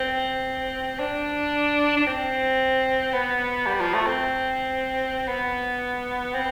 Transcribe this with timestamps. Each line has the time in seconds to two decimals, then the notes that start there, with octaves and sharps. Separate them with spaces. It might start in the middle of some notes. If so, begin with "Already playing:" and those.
Already playing: C4
0.99 D4
1.97 D4
2.07 C4
3.13 B3
3.67 G3
3.81 F3
3.94 A3
4.06 C4
5.28 B3
6.34 C4